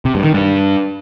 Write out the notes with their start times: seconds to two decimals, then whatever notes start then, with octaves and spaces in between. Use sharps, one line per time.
0.05 C3
0.15 G2
0.25 D#3
0.34 G2